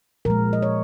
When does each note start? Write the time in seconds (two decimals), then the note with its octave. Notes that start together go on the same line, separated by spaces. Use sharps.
0.25 A#2 F3 G#3 A#4
0.53 D#5
0.62 C#5